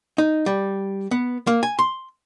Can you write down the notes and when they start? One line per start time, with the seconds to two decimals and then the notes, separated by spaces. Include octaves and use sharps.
0.18 D#4
0.46 G3
1.11 B3
1.47 A#3
1.63 G#5
1.79 C6